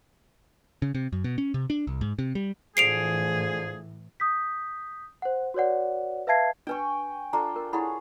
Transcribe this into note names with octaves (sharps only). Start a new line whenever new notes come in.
C#3
C3
F#2
B2
C#4
C3
D4
C2
G#2
C3
G3
A2 D3 E3 F3 G#4 C7 D7 F7
D#6 G6 B6
C5 F#5
F#4 B4 C#5 D5 F#5
B4 E5 F5 A5 G#6 C7
D4 B4 G5 G#5 C#6
D4 F4 A4 A#5
A#4
E4 G#4 C#5 F#5 B5